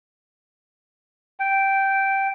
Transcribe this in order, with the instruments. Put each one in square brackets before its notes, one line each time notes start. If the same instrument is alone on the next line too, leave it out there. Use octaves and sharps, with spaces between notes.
[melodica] G5